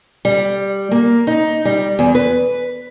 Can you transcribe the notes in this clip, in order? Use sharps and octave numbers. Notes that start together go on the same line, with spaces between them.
G3
A#3
D#4
G3
E2
B4